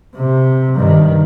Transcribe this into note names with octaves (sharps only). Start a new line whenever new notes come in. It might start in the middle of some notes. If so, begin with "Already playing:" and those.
C3
G2 D#3